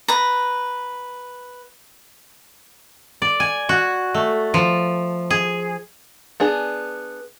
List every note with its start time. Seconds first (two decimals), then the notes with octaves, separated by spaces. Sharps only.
0.08 B4 A#5
3.22 D5
3.40 G#5
3.69 F#4
4.14 A3
4.54 F3
5.30 G#4
6.40 B3 D4 G#4